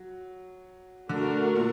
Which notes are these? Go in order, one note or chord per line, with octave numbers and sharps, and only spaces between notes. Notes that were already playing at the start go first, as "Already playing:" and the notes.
Already playing: F#3
D3 A3 D4 F#4 A#4
A#2